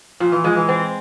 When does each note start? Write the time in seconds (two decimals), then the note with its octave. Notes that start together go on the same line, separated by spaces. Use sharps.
0.20 A#2 F3
0.32 E3
0.44 F3 G#3
0.56 E3
0.68 C4